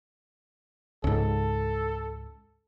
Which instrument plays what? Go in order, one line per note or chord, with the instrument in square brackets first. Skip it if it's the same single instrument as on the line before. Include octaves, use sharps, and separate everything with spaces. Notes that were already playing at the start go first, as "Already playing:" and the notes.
[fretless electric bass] C#2 G#2 [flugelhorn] A4